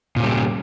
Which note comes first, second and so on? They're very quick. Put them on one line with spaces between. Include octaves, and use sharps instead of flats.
A#2 C#3 G3